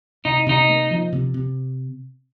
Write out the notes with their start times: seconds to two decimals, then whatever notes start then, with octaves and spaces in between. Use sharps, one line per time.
0.25 C3 D#4
0.46 C3 D#4
0.69 A#3
0.91 F3
1.12 C3
1.34 C3